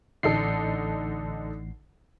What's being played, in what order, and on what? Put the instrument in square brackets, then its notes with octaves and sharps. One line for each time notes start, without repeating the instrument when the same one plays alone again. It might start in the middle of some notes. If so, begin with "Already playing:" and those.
[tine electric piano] A1 C7 [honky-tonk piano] D3 D#4 A4